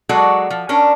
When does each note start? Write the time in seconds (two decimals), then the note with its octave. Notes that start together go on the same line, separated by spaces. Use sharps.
0.09 F#3 G#3 F#4 A4 D5
0.50 F3
0.69 C#4 D4 A#4